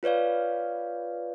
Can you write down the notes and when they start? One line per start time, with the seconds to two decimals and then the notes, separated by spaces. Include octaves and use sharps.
0.03 F4 B4 C#5 D5 F5